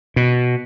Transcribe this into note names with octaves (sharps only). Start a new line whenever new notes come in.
B2